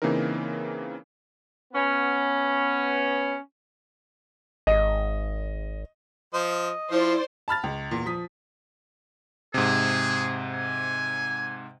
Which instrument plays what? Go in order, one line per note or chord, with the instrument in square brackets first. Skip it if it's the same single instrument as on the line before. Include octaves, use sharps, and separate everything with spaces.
[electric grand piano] C#3 E3 A#3 C4 D#4 A#4
[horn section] B3 C#4
[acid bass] G#1 [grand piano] D#5
[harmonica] F3 C5 [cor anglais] D#5
[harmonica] F3 [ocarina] E4 [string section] C5 D5
[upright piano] A5 B5 F6 A6
C#2
E2 A#2
F3 D#6 B6
[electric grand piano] G#2 C3 [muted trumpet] G#4
[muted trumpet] G#5